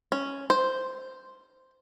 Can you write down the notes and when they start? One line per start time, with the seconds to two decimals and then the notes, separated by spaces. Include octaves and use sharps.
0.12 C#4
0.50 C5